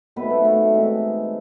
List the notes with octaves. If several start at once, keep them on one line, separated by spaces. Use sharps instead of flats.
D#3 F#3 A3 B3 C4 B4
A3 A4
A3 A4
E3 G#3 C4 D#4